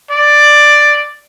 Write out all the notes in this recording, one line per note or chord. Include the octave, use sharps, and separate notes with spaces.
D5